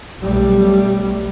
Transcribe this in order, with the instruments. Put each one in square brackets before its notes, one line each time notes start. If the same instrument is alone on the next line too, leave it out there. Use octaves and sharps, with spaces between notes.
[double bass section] B1 G3 A3